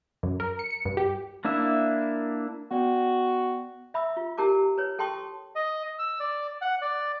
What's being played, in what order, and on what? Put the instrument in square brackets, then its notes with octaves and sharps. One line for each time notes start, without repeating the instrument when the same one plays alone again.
[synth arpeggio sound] F#2
A#4
C#7
C#7
G2
G4
[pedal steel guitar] A#3 D4 E4 E5
[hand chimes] B3 D5 G5 [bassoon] F#4
[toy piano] E5 B5 D#6 E6
F4
E4 G4 A#4 A5 D6
B4 C#5
A4 G5 A5 C6 C#6 D#6
[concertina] D#5
E6
D5
F#5
D5